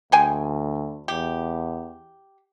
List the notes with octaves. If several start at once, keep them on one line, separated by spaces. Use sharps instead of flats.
D2 G#3 G5 G#5
E2 G4